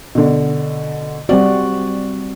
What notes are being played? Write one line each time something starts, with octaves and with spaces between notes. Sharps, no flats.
B2 D3
G3 C4 F#4 D5